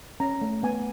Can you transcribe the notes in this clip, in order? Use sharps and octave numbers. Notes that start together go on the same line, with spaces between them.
C#4 A#5
A3
B3 G#5